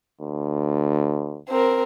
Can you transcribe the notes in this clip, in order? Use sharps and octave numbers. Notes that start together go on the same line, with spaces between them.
D2
C4 A#4